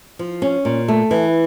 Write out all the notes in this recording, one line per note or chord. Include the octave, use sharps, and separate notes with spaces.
F3
C#4
A#2
A3
E3